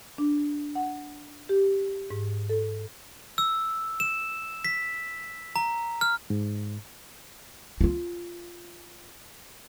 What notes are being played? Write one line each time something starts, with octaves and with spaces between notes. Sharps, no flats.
D4
F#5
G4
G#2
A4
E6
E7
B6
A#5
F6
G#2
E4 F4